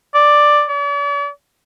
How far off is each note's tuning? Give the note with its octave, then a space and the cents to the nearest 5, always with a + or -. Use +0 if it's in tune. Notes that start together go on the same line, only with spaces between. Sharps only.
D5 +5
D5 -45